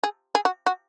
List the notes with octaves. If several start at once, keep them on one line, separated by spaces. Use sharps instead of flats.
G#4
G#4
F#4
F#4